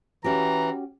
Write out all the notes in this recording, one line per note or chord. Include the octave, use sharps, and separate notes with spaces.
E3 C#4 F#4 G4 A#5